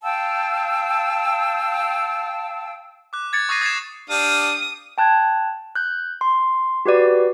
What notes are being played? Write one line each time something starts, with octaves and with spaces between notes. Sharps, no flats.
F5 G5 A5 E6
D6 F#6
D6 G#6 A6 C#7
C#6 D#6 F#6 A#6 C7 D#7
D#6 G#6 A6 C7 C#7 E7
D4 G4 F5 D#6
G5 A5 F#6 G#6
F#6 G6
C6
F#4 G4 B4 D5